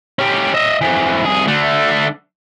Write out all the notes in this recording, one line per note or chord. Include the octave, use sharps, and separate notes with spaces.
C#4 G4
D#5 E5
F2 E3
C2 G#4
D3 A3